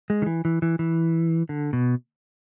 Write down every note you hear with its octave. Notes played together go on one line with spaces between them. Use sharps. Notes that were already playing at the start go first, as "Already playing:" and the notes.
G#3
D#3
E3
E3
E3
E3
D3
B2